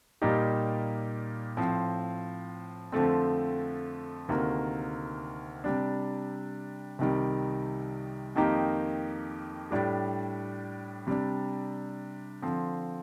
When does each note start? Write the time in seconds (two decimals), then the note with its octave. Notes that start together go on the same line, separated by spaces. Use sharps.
0.22 A#2 G3 A#3 D#4 G4
1.57 A2 F3 C4
2.92 F2 D3 F3 A3 C4
4.28 D2 C3 D#3 A#3
5.64 C3 G3 D4
6.99 C2 C3 D#3 G3
8.35 F2 D#3 A#3 D#4 G4
9.71 A2 G3 D4 G4
11.07 C3 G3 D4
12.42 D3 F3 C4